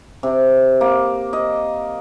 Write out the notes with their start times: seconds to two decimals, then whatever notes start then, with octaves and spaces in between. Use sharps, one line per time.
0.23 C3
0.81 A#3
1.33 D#5